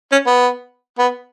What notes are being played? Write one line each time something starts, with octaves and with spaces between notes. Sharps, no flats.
C#4
B3
B3